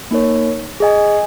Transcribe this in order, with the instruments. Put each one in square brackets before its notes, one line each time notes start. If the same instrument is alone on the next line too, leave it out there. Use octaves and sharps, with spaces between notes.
[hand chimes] A#3 D#4 A#4 C#5
G#4 D#5 G#5